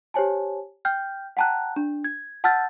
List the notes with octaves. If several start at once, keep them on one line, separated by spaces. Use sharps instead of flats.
G4 C5 C#5 G#5 A5
G5 F6 G6
F#5 G5 A5 A#5 F#6
D4
G#6
F#5 A5 E6 F6 G6 A6